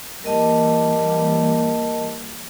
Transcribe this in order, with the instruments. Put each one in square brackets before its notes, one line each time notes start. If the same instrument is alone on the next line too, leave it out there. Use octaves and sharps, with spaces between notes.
[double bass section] E3 G3 A#3 [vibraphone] A#4 D#5 A5